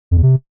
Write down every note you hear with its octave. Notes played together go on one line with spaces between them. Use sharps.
F2
E2
C3